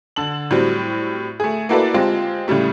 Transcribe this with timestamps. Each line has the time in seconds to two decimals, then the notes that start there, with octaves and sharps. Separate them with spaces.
0.16 D3 A5 F#7
0.51 A2 F#3 G3 C4
1.40 A3 G#4
1.69 A#3 E4 F#4 A4 B4 D5
1.94 G#3 C4 F4 G4
2.48 A2 C#3 G3 A3